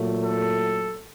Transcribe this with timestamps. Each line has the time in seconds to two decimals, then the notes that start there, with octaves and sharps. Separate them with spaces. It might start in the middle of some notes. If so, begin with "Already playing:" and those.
Already playing: A#2 F#3 A3
0.23 A4